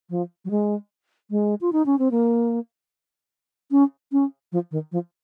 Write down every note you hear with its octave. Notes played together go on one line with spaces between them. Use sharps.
F3
F#3
G#3
G#3
F4
D#4
C#4
C4
A#3
C#4
C#4
F3
D#3
F3